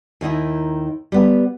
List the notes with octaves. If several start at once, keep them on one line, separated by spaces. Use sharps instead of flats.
D#2 D#3 D#4 E4
G3 B3